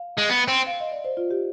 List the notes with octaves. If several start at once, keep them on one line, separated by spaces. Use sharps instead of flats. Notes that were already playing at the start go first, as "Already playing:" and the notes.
Already playing: F5
G#3
B3
C4
F5
D#5
D5
C5
F4
G4